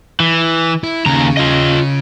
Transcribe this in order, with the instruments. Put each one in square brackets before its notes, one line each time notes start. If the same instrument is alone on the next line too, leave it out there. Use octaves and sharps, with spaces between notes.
[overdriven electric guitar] E3
[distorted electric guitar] E4
[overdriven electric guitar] D#2 A#5 [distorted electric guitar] C#3
[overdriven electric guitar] F4 D#5